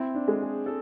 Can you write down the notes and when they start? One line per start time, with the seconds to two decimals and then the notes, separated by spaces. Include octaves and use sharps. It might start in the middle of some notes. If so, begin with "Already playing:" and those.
Already playing: C4 E4
0.15 D4
0.28 G#3
0.41 G#4
0.66 A4